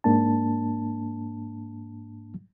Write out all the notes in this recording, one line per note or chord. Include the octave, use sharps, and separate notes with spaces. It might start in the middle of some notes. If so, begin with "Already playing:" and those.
G#2 A#3 D4 A5